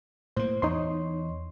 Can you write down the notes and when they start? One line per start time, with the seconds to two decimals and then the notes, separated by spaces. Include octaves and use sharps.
0.37 A2 A#3 C5
0.62 E2 D#4 C#5 C6